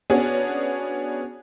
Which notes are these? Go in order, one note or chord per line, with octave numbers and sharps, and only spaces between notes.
B3 C#4 D4 F#4 G#4